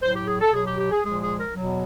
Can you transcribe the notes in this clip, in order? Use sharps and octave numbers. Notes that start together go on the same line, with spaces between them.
A2 F#3 C5
G4
G#4
A4
B2 F#3 G#4
G4
G4
G#4
A#2 F3 G#3 G#4
G#4
A#4
E2 B2 F#3